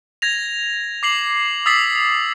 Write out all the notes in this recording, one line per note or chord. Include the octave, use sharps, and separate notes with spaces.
G#6 A#6 F7
D6 C7 F#7
D#6 E6 A6 B6 C7 F#7